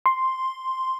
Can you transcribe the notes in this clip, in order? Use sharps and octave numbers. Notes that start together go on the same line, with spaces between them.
C6